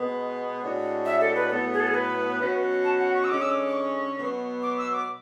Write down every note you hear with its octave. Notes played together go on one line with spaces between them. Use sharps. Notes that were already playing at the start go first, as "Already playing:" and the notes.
Already playing: B2 G#3 B3
A2 G#3 D4 F#4 C#5
E5
A4
B4
A2 F#3 B3 A4
G#4
A4
G#4
B4
B2 F#3 C#4 F#4
A5
F#5
C#6
E6
D3 G#3 C#4 D6
E6
D6
D6
C#6
B2 F#3 B3
D6
E6
D6